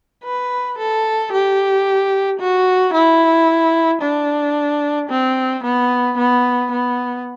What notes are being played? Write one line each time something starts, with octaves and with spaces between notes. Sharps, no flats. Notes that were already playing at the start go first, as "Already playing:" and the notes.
B4
A4
G4
F#4
E4
D4
C4
B3
B3
B3